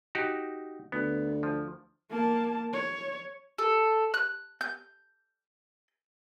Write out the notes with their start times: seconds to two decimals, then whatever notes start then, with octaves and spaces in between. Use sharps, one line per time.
0.15 D#4 F#4 G4
0.92 D2 B3
1.43 F3
2.10 A#3 A5
2.73 C#5
3.58 A4
4.14 F#6
4.61 G6